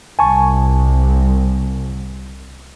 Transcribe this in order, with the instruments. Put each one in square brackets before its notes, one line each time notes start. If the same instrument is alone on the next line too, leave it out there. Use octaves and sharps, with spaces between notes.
[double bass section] C2 [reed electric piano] G#5 A5 C#6